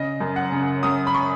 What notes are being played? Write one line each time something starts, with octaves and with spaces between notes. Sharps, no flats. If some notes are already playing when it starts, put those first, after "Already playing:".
Already playing: C#3 D#5
F#2
F#5
C#3
F#2 D#6
B5
C#6